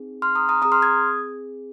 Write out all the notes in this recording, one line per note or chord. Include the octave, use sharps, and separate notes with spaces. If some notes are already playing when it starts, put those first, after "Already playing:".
Already playing: C4 D#4 G#4
C6 F6
A#5 D#6
A#5 D#6
C4 G#4 A#5 D#6
C6 F6
D#6 G#6